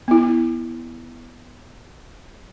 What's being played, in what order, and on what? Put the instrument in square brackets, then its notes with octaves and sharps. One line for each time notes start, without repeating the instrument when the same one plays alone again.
[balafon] B3 E4